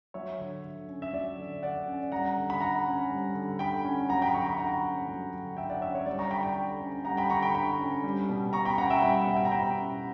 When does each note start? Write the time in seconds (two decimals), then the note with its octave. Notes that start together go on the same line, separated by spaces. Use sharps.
0.14 F#3 C#5 E5
0.39 D3
0.64 D3
0.88 C#4
1.02 E5
1.13 F#3 D5
1.38 D3
1.62 D3 D5 F#5
1.88 C#4
2.12 G3 F#5 A#5
2.37 D3
2.50 B5
2.61 D3 F#5 A#5
2.86 C#4
3.10 G3
3.35 D3
3.59 D3 G5 B5
3.84 C#4
4.09 F#3 F#5 A#5
4.22 G5 B5
4.33 D3 A#5 C#6
4.46 G5 B5
4.58 D3 F#5 A#5
4.83 C#4
5.08 F#3
5.33 D3
5.57 D3 E5 G5
5.70 D5 F#5
5.81 C#4 C#5 E5
5.95 C#5
6.06 G3 D5
6.19 A#5 C#6
6.31 D3 G5 B5
6.43 G5 B5
6.57 D3
6.81 C#4
7.05 G3 F#5 A#5
7.17 G5 B5
7.30 D3 A#5 C#6
7.42 G5 B5
7.54 D3 G5 B5
7.79 C#4
8.03 G3
8.29 B2
8.53 B2 A#5 C#6
8.65 G5 B5
8.78 C#4 F#5 A#5
8.90 E5 G5
9.02 G3 G5 B5
9.21 E5
9.27 B2 F#5
9.36 G5
9.45 A#5
9.51 B2 G5 B5
9.76 C#4